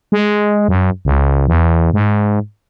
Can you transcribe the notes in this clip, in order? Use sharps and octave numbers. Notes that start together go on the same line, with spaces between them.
G#3
F#2
C#2
E2
G#2